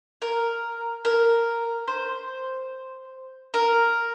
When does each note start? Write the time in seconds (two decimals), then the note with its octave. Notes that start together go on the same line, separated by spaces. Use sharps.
0.22 A#4
1.05 A#4
1.88 C5
3.54 A#4